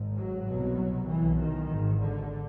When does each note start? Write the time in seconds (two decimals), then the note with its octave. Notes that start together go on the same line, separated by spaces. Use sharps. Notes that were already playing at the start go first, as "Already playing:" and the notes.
Already playing: G#1 G#2
0.16 F#3
0.47 C2 B2
1.08 B1 B2 E3
1.39 D#3
1.70 G#1 G#2
1.99 D3